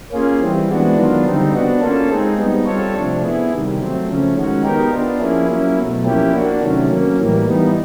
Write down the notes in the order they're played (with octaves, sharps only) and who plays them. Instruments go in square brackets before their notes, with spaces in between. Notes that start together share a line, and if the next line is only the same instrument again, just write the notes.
[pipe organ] A#3 C#4 F4 G#4
E3 G3 C4
E3 G#3 B3 D4 F#4
D#3 F#3 B3 D4 F4
D3 G3 C4 D#4
B3 D4 F#4
A#3 C#4 F4 A4
G#3 C4 D#4 G#4
G3 B3 D#4
G3 C4 F4 A4 C#5
C3 F3 A3 D4
B3 E4 G#4
C3 D#3 G3
F#3 A3 C4
C#3 F3 A3 C#4
D#3 G#3 C#4 F#4
B3 D#4 G4 A#4
B3 D4 F4
F3 A#3 C#4 E4 G#4
F#3 A#3 C#4 E4
B2 F#3 A3
F3 A#3 C#4 E4 G4
A#3 D4 F#4
C3 D#3 F#3 A3 C#4
F#3 A#3 C#4
A2 E3 G3 A#3
E3 G3 B3 D#4